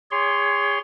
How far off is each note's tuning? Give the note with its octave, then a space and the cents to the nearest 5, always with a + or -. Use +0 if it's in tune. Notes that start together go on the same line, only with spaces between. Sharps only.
G#4 -30 C#5 +20 C6 +0